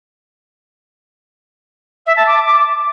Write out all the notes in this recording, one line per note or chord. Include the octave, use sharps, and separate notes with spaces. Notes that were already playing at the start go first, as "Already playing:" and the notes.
E5
A5
D6